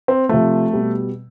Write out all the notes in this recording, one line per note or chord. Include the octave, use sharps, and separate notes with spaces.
C4
C3 F3 A3
B2 G3